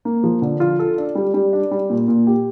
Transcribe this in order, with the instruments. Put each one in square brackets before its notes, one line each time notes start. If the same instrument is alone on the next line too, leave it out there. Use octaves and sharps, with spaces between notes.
[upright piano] A#3
F3
D3
F4
A4
D4
G3
G3
D4
G3
A#2
A#2
G4